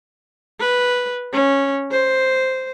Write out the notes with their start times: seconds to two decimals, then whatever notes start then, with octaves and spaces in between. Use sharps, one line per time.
0.60 B4
1.33 C#4
1.91 C5